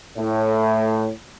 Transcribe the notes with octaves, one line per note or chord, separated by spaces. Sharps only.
A2